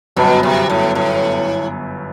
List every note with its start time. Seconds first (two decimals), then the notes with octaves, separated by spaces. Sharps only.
0.16 G1 F#2 B2 F#3 B3
0.43 C3
0.70 A2
0.95 A2